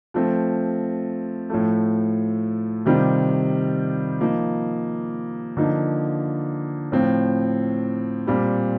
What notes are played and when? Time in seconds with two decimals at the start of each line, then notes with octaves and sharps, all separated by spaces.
0.14 F3 A3 C4
1.50 A2 F3 A3
2.86 C3 D#3 G3 C4 F4
4.21 F3 A#3 D#4
5.57 D3 F3 A#3 D#4
6.92 A2 F3 C4 F4
8.27 A#2 G3 C4